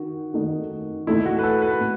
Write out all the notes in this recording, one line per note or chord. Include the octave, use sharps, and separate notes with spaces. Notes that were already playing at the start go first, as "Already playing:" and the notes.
Already playing: D#3 F#4
D#3 A3 D#4
A2 E3 A3 D#4 E4
F#4
B4
A4
B4
A2